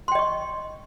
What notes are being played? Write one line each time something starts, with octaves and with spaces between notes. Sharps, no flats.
D#5 G5 C6 C#6